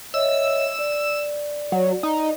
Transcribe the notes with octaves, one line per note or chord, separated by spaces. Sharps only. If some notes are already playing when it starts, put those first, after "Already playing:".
C#5 D#5 E5 E6
D5
F#3
D#4